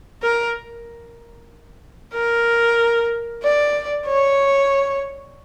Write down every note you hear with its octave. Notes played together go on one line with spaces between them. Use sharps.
A#4
A#4
D5
C#5